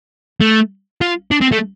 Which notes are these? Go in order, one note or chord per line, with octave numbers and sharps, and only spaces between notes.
A3
F4
D4
C4
A3